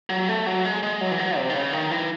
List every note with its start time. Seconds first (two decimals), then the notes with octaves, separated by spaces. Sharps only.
0.10 F#3
0.29 A3
0.47 F#3
0.65 G#3
0.83 G#3
1.01 F#3
1.11 E3
1.19 F#3
1.38 C3
1.50 D#3
1.54 C#3
1.73 D#3
1.91 E3